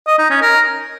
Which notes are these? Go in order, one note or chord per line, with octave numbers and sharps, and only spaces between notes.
D#5
D#4
C#4
A#4